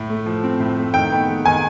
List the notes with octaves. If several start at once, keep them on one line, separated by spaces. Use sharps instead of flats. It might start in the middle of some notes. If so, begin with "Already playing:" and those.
Already playing: A2
A3
F3
C4
A2
A3
D#3 G5
B3
G#3
D#3 G#5